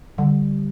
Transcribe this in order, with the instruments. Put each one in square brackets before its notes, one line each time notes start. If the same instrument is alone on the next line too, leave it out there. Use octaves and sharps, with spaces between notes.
[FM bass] D3 [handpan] G3